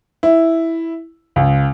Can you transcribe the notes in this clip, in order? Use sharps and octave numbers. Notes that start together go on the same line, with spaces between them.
E4
C#2